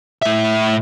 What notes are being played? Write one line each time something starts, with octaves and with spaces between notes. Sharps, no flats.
A2 E5